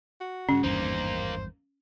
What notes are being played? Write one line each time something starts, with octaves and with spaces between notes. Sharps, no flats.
F#4
G2 C#3 C#4
G#1 E2 G2 A#3 D#4 C5